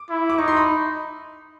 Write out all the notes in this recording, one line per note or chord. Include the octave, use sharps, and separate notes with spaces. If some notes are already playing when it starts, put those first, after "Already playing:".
Already playing: D6
E4
D6
D#4 C#6
C6
B5